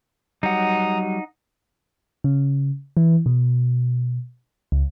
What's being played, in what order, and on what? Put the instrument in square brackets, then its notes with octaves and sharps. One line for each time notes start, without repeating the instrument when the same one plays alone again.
[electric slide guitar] F#3 G3 [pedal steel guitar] D#4 F#5 [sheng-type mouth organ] A#5 D#6
[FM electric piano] C#3
E3
B2
C#2